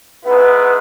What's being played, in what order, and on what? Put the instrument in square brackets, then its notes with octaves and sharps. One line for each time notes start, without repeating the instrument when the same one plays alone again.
[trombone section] G#2 B3 E4 [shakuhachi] B4